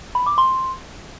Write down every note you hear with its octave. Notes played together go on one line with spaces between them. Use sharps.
B5
D6
C6